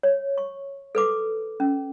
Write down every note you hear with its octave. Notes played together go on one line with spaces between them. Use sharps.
C#5
C#6
A4 B4 D6
C#4